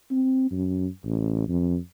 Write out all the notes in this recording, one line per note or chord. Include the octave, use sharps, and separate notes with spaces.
C4
F#2
A1
F2